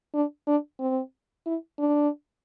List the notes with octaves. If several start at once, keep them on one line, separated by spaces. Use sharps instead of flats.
D4
D4
C4
E4
D4